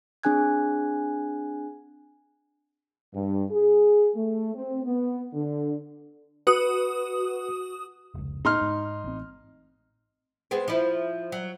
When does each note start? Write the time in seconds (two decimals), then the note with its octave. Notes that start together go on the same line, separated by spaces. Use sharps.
0.23 C4 D4 G#4 G#5 F#6 G#6
3.13 G2
3.50 G#4
4.15 A3
4.55 C4
4.84 B3
5.34 D3
6.47 F#4 B4 D#6
8.14 F1 C#2
8.45 A2 D#4 C6 F6
8.61 G#2
9.04 A1 C4
10.51 G#3 B3 C4
10.68 F3 E4
11.32 F#3